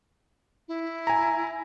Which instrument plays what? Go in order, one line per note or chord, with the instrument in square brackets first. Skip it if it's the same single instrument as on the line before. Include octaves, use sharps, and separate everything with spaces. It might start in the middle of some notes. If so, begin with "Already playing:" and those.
[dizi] E4
[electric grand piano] G#5 A#5